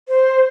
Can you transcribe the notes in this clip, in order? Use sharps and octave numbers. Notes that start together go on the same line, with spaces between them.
C5